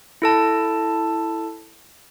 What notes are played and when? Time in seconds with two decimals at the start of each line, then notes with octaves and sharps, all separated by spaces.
0.22 E4 A4 A5